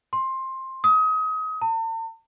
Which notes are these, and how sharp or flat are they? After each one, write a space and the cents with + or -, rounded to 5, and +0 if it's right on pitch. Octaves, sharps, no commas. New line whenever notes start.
C6 +15
D#6 +30
A5 +45